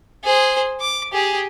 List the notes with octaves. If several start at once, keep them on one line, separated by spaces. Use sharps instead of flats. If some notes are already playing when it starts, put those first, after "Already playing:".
G#4 C5
D6
G4 G#4